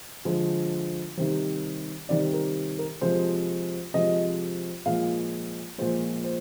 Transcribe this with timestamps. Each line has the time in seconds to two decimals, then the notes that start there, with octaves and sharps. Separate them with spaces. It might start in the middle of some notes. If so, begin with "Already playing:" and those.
0.25 D3 F3 G#3
1.17 C3 D#3 G3 C5
2.09 C3 D#3 G3 D5
2.33 A#4
2.79 A#4
3.01 C3 F3 G#3 C5
3.94 C3 F3 G#3 D#5
4.86 A#2 F3 G#3 F5
5.78 A#2 F3 G#3 C5
6.24 C5